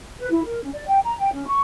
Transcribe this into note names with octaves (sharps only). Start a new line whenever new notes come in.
B4
E4
A#4
C#4
D5
G5
A#5
G5
C#4
C#6